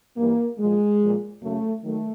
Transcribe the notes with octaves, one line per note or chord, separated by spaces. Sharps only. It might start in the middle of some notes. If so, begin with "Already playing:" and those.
G2 E3 G3 A#3
A#2 F3 G#3
A#2 F3
F#2 C#3 F#3 A3
D#3 F#3 A3